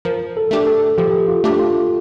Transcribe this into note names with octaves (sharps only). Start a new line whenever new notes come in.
F3 A#4
A4
A3 D4 G4
A4
F3 G4
F4
A3 D4 G4
F4